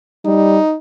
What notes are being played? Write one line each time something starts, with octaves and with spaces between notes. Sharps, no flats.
G3 D#4